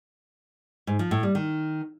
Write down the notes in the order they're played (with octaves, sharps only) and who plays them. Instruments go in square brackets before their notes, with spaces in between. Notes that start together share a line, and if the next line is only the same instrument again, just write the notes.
[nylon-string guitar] G#2
F3
A2
G3
D#3